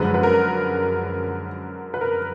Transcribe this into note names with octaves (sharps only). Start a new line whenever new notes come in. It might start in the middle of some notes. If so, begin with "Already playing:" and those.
Already playing: F#2 D3 F3 G#3 B4
B4
A#4
B4
A#4